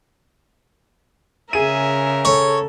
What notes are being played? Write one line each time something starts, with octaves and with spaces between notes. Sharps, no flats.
C#3 G#4 A#4 E5 D#7
A4 C#5